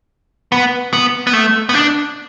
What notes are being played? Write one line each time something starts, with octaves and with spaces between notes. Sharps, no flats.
B3
B3
B3
A3
B3
D4